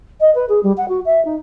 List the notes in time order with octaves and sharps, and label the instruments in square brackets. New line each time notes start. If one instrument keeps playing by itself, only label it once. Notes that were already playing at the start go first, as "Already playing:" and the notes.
[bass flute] D#5
B4
G#4
G3
F#5
F#4
E5
D#4